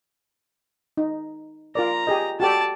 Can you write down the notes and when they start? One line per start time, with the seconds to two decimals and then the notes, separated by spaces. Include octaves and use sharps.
0.97 D#4
1.75 F4 A#4 D5 A#5
2.07 G4 G#4 D#5
2.40 F#4 G4 A4 D5 A5